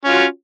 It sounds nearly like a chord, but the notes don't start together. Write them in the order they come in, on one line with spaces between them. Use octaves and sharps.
C#4 F4 F#4